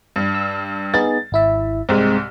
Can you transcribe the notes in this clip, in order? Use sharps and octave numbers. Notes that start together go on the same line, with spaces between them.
G2
E6
B3 D#4 G#4 A6
G#1 E4 E5
C2 G#2 G#3 C4